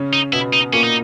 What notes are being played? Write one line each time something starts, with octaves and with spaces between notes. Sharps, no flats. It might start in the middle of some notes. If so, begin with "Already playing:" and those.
Already playing: C#3 C#4
D#4
B2 B3 E4
D#4
A#2 A#3 C#4
D#4